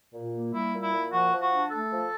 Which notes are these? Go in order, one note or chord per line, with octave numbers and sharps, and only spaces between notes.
A#2
A#3
G3 E4
A#2
E4
A#2
F3 F#4
F3
F#4
D4
A3 A4
F3